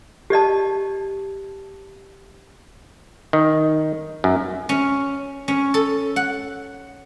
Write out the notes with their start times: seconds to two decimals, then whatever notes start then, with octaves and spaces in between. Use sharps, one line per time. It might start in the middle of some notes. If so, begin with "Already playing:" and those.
0.30 G4 D5 D#5 A5
3.33 D#3
4.24 F#2
4.69 C#4
5.48 C#4
5.74 A4
6.16 F#5